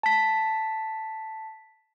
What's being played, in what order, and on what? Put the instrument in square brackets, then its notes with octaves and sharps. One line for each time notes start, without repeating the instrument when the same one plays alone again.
[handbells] A5 B6